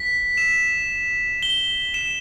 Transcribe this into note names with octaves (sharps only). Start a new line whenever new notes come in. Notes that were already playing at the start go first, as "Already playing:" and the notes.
Already playing: B6
E7
G7
E7